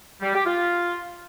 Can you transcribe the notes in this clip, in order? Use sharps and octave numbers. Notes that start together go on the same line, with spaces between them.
G3
G4
F4